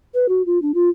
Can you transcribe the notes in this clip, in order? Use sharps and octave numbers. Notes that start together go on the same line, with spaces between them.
B4
F#4
F4
D4
F4